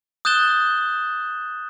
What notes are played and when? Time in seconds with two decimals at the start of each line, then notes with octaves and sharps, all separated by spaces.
0.25 D#6 F#6 G6 A6 E7 G7